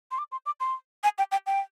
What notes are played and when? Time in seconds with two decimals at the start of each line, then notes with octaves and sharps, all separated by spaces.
0.11 C6
0.18 D6
0.32 C6
0.46 D6
0.60 C6
1.03 G#5
1.18 G5
1.32 G5
1.46 G5